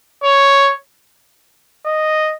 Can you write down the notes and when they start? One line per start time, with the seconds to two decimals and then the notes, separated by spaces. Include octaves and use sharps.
0.23 C#5
1.86 D#5